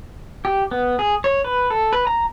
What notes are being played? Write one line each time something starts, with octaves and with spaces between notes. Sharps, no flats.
G4
B3
G#4
C#5
B4
A4
B4
A#5